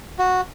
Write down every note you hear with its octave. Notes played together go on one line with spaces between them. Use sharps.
F#4